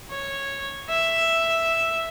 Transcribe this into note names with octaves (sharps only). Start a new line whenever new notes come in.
C#5
E5